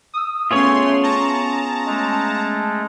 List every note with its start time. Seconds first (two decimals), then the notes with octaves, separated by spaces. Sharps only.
0.14 D#6 E6
0.51 A3 B3 C#4 F4 G#4 C#5 C6
1.03 A5 A#5
1.87 G#3 A3